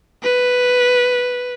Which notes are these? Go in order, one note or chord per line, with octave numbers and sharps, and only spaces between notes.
B4